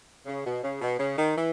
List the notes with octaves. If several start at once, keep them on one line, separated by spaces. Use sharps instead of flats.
C#3
B2
C#3
B2
C#3
D#3
E3